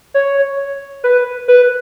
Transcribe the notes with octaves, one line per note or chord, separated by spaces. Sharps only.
C#5
B4
B4